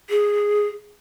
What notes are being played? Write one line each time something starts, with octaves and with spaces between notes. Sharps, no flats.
G#4